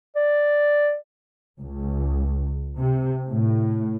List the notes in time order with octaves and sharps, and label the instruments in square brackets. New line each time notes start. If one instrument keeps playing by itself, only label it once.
[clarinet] D5
[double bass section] C#2
C3
A2